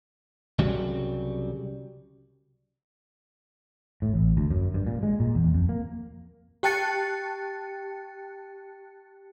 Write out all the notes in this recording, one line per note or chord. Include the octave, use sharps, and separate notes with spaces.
C2 C#3 F#3 G3
A2
A1
D2
F#2
G2
A#2
G#3
A#2
E2
F2
A#3
G4 G5 A5 F#6 A6 C#7